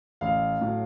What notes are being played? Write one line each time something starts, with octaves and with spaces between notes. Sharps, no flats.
A1 F5
A2 F#3